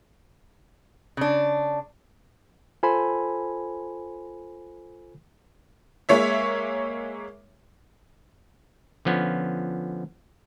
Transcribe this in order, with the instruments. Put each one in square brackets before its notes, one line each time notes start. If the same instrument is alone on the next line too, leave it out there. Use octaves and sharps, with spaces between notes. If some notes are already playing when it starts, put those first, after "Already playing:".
[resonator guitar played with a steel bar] C#3 D4
[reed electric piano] F4 A4 C5 G#5 B5
[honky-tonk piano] G#3 A#3 C#5 E5
[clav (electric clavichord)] D3 F3 B3 C#4